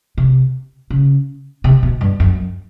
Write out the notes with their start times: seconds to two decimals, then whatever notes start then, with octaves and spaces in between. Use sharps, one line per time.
0.18 C3
0.90 C#3
1.64 C3
1.83 B2
2.01 G2
2.20 F#2